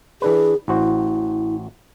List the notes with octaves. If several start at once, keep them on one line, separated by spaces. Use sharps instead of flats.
E3 D4 G#4 B4
A1 E4 F#4 C5